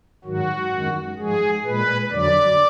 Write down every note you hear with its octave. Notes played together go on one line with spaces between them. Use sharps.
G#2 D#3 F#3 F#4
F#2 D#3 G#3
G#2 F3 G#3 G#4
A#2 G#3 B4
F2 D3 F#3 D5